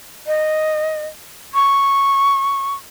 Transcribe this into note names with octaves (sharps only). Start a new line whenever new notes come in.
D#5
C#6